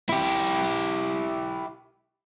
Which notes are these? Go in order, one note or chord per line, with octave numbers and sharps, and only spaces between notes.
E4 G4